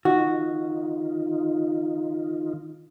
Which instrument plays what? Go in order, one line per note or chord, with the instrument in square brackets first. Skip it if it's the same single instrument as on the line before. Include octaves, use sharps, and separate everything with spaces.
[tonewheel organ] D#3 D#4 F4 [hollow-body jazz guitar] F#4